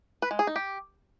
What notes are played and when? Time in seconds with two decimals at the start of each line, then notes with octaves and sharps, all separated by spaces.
0.22 B4
0.31 G#3
0.39 G#4
0.47 D#4
0.56 G4